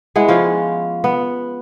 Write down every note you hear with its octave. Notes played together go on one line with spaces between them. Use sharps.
G#3 B3 E4
F3 C#4 F4
B3